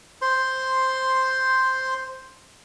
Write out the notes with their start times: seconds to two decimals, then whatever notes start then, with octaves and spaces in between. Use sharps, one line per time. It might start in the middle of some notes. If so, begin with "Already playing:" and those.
0.22 C5 C6